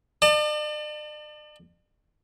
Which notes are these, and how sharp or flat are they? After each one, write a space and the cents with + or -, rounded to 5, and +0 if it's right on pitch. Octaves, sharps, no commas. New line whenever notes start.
D5 +45 A5 +35